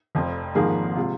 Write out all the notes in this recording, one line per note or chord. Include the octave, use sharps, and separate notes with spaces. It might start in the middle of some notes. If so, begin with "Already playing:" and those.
F1 F2 F3
G#1 G#2 F3 A#3 G#4
C3 G#3 F4